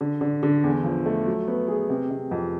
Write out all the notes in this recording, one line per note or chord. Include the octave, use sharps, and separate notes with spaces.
D3
D3
D3
E2
F3
A3
F#3
B3
G#4
C3
C3
F2